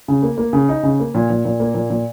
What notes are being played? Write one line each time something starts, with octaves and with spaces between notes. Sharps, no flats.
C#3
A#3
A#3
C#3
D#4
C#3
A#3
A#2
A#2
A#2
A#3
A#2
A#2